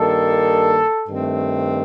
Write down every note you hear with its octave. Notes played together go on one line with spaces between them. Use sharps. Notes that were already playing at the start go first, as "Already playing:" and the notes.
Already playing: G2 D#3 A#3 A4
G2 D#3 A3 C4